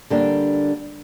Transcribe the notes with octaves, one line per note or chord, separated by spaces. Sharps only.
D3 G3 A#3 D4